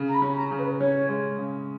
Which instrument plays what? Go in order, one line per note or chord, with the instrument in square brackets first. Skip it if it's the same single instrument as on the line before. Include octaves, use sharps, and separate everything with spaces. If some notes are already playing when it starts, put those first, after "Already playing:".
Already playing: [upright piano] C#3
[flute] A#5
B5
[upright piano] C#4
[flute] A#5
[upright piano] C#3
[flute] B4
[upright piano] C#4 [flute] C#5
[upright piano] G#3
C#3